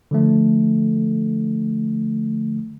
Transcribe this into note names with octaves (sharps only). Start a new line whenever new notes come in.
D3 F3 A3